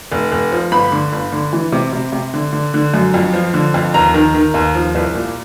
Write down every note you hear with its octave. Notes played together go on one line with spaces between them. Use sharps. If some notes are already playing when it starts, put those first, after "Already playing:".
F1
F1
F3
G1 B5
D3
G1
D3
E3
C3
C3
C3
D3
D3
D3
F#2
F2
F3
D3
F2
D#2 A#5
D#3
D#3
D#2
F3
C2
A#2